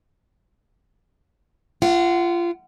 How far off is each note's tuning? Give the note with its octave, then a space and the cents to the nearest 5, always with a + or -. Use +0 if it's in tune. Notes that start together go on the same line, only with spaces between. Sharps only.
F4 -25 F#5 +20